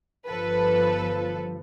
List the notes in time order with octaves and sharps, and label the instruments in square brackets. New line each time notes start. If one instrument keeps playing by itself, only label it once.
[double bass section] G1 F3 [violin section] A4 B4